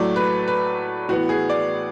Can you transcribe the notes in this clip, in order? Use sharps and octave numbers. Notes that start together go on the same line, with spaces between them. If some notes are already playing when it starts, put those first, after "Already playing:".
Already playing: A2 F#3 A3 D5
B4
B4
A2 E3 B3 F#4
G#4
D5